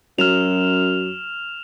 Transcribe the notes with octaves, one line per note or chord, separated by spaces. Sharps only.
F#2 F#3 F6 E7 F7